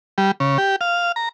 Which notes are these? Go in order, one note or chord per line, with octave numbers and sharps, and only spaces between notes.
G3
C#3
G4
F5
A#5